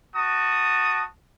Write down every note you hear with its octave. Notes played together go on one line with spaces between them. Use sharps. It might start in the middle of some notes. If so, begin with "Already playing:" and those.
F#4 A5 D#6